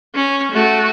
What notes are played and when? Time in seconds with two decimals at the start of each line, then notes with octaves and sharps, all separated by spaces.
0.15 C#4
0.52 A3 F#4